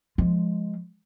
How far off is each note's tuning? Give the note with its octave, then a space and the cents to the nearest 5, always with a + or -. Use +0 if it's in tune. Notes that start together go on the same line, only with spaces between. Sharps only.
F3 +0 G#3 +0